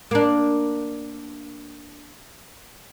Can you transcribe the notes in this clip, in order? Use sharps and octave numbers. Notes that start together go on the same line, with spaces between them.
A#3 D4